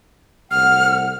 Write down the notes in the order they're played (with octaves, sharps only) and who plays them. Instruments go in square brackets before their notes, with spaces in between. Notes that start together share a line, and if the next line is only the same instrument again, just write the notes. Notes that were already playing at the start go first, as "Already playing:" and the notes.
[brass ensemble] C2 A2 F#5 [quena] F6